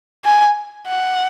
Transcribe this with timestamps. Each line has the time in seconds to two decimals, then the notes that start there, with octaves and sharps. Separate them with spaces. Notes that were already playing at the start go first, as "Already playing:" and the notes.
0.25 G#5
0.88 F#5